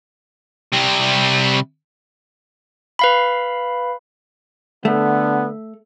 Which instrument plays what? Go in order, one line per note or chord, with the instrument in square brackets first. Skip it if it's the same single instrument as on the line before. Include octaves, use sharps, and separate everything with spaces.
[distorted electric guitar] C3 G3
[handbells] B4 F5 B5
[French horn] D3 [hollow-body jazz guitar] A3 [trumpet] B3